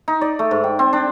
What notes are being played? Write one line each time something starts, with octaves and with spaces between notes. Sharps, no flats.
D#4
D5
A3
G#2
G5
C4
D4